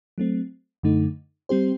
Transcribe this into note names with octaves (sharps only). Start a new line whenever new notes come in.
F#3 A3 C4
F#2 D3 A3 D#4
G3 C4 G4 C5